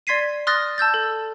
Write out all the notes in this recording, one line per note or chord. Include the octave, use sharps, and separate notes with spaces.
D5 C6 G#6 B6 C7 D#7
C6 D#6 F6 F#6 A6 A#6
A5 E6 G6 A6
A4